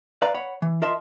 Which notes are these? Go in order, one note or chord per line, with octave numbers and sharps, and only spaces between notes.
B4 D5 F5 A#5
C#5 F#5 B5
E3
F4 A#4 D#5 E5 A5 C6